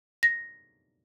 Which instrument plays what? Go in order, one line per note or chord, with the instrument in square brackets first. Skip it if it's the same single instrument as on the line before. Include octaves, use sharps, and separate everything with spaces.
[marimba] A#6